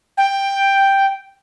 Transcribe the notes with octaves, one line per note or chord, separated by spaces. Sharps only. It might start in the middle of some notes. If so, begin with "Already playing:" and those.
G5